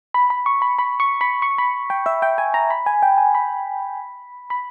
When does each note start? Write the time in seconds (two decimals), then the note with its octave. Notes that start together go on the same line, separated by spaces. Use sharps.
0.14 B5
0.30 B5
0.46 C#6
0.62 B5
0.79 B5
1.00 C#6
1.21 B5
1.42 C#6
1.58 B5
1.90 G5
2.06 E5
2.22 G5
2.38 G#5
2.54 A#5
2.70 B5
2.86 G#5
3.02 G5
3.18 G#5
3.35 B5
4.50 B5